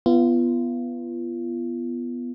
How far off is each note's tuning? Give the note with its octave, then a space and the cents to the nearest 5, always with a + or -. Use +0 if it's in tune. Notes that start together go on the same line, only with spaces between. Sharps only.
B3 +0 F4 -35